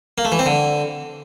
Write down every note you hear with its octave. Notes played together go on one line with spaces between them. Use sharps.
A#3
A3
E3
C4
D3